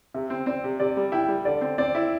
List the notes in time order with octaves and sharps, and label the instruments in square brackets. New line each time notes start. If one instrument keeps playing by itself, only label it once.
[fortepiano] C3 [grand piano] E5
[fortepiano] C4
[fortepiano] C4 [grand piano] D5
[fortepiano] C3
[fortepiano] C3 [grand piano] D5
[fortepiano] G3
[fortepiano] E4 [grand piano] G5
[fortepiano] G3
[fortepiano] D3 [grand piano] D5
[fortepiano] C4
[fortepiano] C4 [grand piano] D5
[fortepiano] E4